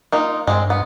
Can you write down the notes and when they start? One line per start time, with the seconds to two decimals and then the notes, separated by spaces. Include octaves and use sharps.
0.12 A#3 D#4 F4
0.47 G2 G#3 C4
0.70 B3